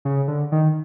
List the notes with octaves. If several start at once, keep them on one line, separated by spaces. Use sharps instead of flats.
C#3
D3
D#3